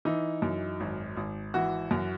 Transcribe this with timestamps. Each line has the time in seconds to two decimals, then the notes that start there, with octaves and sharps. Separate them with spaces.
0.05 E3 D#4
0.42 F#2
0.80 G#1
1.17 G#1
1.54 E3 F#4
1.91 F#2